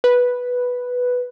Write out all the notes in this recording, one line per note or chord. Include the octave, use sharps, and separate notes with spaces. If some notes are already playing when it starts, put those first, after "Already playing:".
B4